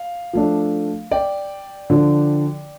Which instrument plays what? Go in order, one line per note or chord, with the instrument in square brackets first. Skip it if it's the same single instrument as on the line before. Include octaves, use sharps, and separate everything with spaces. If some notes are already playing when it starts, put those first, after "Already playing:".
Already playing: [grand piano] F5
F3 A3 D4
D5 G5
D3 F3 D4